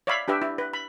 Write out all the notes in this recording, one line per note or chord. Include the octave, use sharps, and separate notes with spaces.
C#5 D5 E5 F5 B5
D4 G4 B4 E5
E4
B4
B5